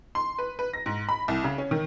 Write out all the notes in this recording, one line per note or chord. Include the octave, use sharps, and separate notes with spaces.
C6
B4
B4
A#6
G#2
B5
C2
C#3
C#4
D#3